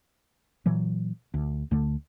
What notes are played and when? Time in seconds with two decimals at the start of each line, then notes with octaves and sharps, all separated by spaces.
0.66 A#2 E3 F#3
1.34 D2
1.71 D2 D3 A3